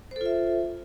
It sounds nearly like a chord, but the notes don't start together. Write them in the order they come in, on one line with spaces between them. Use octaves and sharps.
C5 A4 F4 E5